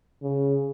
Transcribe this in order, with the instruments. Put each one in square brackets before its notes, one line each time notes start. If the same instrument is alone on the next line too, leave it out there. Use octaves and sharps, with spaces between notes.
[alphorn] C#3